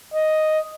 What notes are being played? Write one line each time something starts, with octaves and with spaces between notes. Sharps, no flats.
D#5